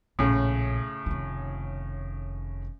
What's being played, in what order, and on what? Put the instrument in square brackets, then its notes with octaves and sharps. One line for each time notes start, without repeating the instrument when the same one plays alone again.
[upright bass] A#1 [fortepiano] A2 C#3
[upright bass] F1 D#3